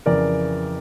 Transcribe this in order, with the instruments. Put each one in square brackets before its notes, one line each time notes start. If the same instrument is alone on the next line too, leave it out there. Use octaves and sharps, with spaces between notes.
[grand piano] F2 C#3 E3 A#4 D5